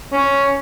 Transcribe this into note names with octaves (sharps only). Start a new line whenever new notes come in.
C#4